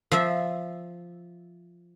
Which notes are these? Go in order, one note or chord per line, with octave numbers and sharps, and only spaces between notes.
F3 E5